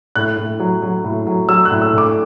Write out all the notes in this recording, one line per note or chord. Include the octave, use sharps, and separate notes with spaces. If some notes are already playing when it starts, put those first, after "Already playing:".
A2 F#6
A2
F#3
F#3
A2
F#3
F#3 E6
F#6
A2
E6
A2
D6